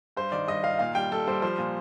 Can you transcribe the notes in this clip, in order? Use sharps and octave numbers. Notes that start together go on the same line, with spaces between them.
G2 C5
D#3 D5
G2 D#5
D#3 F5
A#2 F5
G3 G5
G3 A4
G3 C5
F3 C5
A#2